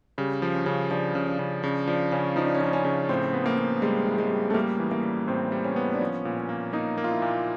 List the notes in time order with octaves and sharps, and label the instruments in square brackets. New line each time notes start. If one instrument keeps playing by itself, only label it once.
[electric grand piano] C#3 [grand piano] G3
[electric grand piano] F3
[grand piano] C#4
[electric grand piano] C#3
[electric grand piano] F3 [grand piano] D4
[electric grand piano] C#3
[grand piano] D4
[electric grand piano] C#3
[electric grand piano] C#3 [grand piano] D4
[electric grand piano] F3 [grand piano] D4
[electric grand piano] C#3 [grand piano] C#4
[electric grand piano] F3 [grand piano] D#4
[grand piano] D4
C#4
[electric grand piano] F3 [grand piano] D4
[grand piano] C#4
[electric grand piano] C#3
[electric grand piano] A2 [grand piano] C4
[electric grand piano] B3
[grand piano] A#3
[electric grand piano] B3
[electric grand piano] G3 [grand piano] G#3
[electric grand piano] A2
[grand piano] G#3
[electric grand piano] G3
[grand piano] A3
[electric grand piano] G3 [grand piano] A#3
[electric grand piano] E3
[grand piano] A#3
[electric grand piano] G3
[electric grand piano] A2 [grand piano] C4
[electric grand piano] G3
[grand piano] C#4
[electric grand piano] B3
[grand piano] D4
[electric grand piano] F3 [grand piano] C#4
[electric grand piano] A#2
[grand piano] C#4
[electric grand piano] A#3
[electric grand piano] A#3 [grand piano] D#4
[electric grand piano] A#3
[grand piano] F4
E4
[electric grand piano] A#2